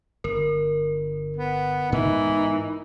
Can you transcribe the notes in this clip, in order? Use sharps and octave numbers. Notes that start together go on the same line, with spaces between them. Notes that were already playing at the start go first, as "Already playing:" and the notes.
G1 A#4
B3
G#2 E3 B3 D#4